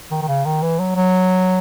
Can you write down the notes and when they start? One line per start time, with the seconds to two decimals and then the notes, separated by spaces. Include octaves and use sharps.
0.11 D#3
0.22 D#3
0.28 C#3
0.45 D#3
0.62 E3
0.79 F#3
0.96 F#3